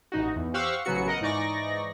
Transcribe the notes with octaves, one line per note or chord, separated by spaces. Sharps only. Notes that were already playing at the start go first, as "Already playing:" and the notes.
A1 D#4 F#4
E2
G4 C5 F5 F#5 C#6 E6
A1 C#3 F#3 B3 F#4 C#7
A#4 D#5 F#5
G#2 E3 D#4 D5 C#6 A#6